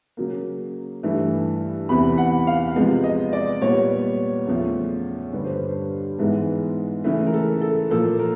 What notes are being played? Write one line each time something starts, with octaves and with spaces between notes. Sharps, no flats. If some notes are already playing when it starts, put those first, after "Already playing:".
C#3 F#3 A#3
G2 E3 A3
E2 C3 E3 B5
F#5
F5
C3 F3 G#3 B3
D#5
D5
A#2 G3 B3 C#5
E2 C#3 F3 A3
G2 D3 G3 B4
C5
B4
G#2 E3 G#3 B3
C#3 E3 A3 B4
A#4
A4
A4
A#2 F3 A#3 A4
A#4